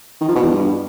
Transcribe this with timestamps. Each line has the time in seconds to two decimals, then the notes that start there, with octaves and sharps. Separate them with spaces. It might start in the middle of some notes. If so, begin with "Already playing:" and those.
0.21 D#3
0.28 F3
0.35 B2
0.43 E2
0.50 G2